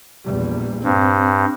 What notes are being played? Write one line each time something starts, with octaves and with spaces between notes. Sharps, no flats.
A#1 E2 G3
G2 C4